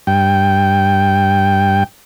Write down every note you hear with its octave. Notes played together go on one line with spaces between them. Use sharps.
G2 G5